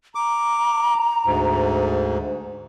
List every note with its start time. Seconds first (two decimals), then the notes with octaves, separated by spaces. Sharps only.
0.15 A#5 D6
1.26 D2 G#2